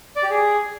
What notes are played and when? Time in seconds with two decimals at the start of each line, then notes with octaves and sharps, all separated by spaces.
0.16 D5
0.23 G4
0.30 G#4